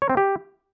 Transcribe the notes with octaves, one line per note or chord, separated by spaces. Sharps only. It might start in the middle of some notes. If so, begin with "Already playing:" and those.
C#5
C4
G4